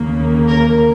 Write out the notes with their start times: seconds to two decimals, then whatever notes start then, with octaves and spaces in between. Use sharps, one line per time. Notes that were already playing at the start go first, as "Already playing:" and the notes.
Already playing: D#2 C#3 A#3
0.49 A#4